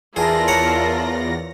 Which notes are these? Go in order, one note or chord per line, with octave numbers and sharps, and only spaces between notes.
E2 F4 G#4 A#4 D5 E5 A5 A#6
C#5 F#5 A#5